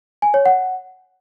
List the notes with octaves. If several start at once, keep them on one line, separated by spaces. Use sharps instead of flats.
G#5
C#5
F#5